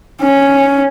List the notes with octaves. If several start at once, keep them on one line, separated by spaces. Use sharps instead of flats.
C#4